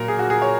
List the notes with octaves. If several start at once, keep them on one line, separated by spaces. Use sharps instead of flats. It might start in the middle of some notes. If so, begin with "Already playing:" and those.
Already playing: A#2 F#3 A#3 A#4
G#4
F#4
G#4
C#5